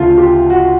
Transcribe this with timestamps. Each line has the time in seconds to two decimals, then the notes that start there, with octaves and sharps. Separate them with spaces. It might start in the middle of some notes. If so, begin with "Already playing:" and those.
Already playing: D2 C#3 F3 A3 F4
0.18 G4
0.50 F#4